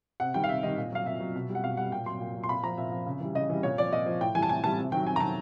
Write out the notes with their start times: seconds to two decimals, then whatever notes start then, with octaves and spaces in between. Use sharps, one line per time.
0.20 C3 F#5
0.34 D#3 G3 G5
0.44 F5
0.49 C3 E5
0.63 D#3 G3 D#5
0.77 A#2
0.92 F#3 F5
1.06 A#2 E5
1.20 F#3
1.35 B2
1.49 G3
1.55 F#5
1.63 B2 F5
1.77 G3 F#5
1.92 A#2 G5
2.06 F#3 C6
2.20 A#2
2.35 F#3
2.44 C6
2.49 A#2 B5
2.63 F3 A#5
2.78 A#2 E5
2.92 F3
3.06 C#3
3.20 E3 G3
3.35 C#3 D#5
3.49 E3 G3
3.63 A#2 C#5
3.78 F3 D5
3.92 A#2 D#5
4.06 F3
4.21 A2 G5
4.35 E3 G3 G#5
4.43 A5
4.49 A2 G#5
4.64 E3 G3 A5
4.78 C3
4.92 D#3 F#3 G5
5.06 C3 G#5
5.16 A#5
5.20 D#3 F#3 A5